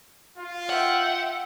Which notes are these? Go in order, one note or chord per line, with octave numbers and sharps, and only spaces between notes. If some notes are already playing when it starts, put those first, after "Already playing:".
F4 F5
E5 F#5 G5